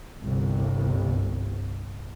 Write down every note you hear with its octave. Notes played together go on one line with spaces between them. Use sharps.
G1 C2